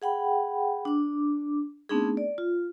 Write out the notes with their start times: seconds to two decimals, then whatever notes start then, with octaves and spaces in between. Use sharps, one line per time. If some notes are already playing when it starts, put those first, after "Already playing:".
0.02 G#4 F#5 G5 B5
0.85 D4 D6
1.89 A3 B3 C4 D4 D#4 G#4
2.17 D5
2.38 F4